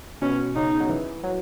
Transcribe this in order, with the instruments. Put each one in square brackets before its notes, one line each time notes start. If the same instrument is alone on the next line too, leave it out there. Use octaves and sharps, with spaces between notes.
[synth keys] B2 [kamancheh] C#4
[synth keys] C#3 [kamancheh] D#4
[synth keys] F#3
E3
F#3